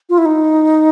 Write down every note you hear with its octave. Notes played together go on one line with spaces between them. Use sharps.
F4
E4
D#4